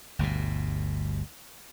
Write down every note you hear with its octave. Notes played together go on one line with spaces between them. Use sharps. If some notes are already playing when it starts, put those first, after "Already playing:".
G1 D2 G2 B2